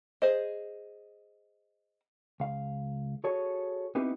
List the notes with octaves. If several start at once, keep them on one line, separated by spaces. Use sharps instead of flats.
G#4 C5 D#5
C#2 F5
F#4 G#4 A4 C#5
B3 C4 D#4 E4 G4 B4